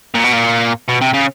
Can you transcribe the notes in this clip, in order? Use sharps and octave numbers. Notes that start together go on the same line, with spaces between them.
A#2
B2
A#2
B2
C3
C#3